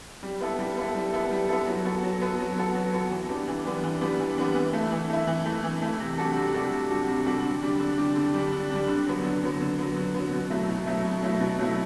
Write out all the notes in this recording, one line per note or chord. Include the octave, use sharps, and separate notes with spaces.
G3
B3 E4 A4
G3
B3 E4 A4
G3
B3 E4 A4
G3
B3 E4 A4
F#3
B3 F#4 A4
F#3
B3 F#4 A4
F#3
B3 F#4 A4
F#3
B3 F#4 A4
E3
G3 B3 D4
E3
G3 B3 D4
E3
G3 B3 D4
E3
G3 B3 D4
E3
A3 E4
E3
A3 E4
E3
A3 E4
E3
A3 E4
C3
G3 D4 F#4 A4
C3
G3 D4 F#4 A4
C3
G3 D4 F#4 A4
C3
G3 D4 F#4 A4
D3
G3 D4
D3
G3 D4
D3
G3 D4
D3
G3 D4
D3
F#3 B3
D3
F#3 B3
D3
F#3 B3
D3
F#3 B3
B2
F#3 A3 E4
B2
F#3 A3 E4
B2
F#3 A3 E4
B2
F#3 A3 E4